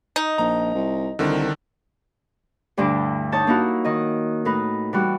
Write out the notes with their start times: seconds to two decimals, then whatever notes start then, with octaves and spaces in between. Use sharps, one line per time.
0.16 D#4
0.38 A#1 A#5
0.75 C2
1.19 C2 D3 D#3 D4
2.77 D2 G2 D3 E4 D6
3.32 D#4 C#5 D#5 A5 G6
3.47 A#3 D#4 E4 F#4
3.85 D#3 D#5
4.45 A2 D#4 B4
4.93 E3 G3 F#4